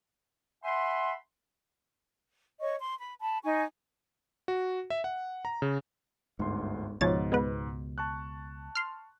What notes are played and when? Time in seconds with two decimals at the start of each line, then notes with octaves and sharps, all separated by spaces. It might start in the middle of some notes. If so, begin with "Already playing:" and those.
0.64 E5 F#5 G#5 B5 C6
2.60 C#5 D#5 C#6
2.79 C6
2.99 B5
3.20 A5 B5
3.42 D#4 G#5 C#6
4.48 F#4
4.90 E5
5.04 F#5
5.45 A#5
5.62 C#3
6.39 G1 D2 G#2 C6
7.01 C#2 G#2 B2 F3 C#5 A6
7.32 G#3 B3 B4
7.98 A5 C#6 F#6
8.75 C6 F6